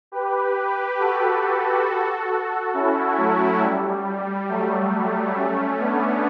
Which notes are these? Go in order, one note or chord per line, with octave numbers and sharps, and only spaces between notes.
G4 B4
F#4 A4
C#4 E4
F#3 A3
G3
F#3 A3
A3 C#4
B3 D4